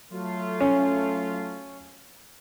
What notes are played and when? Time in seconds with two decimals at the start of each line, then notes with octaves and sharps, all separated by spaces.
0.12 F#3 A3 F4
0.61 C#4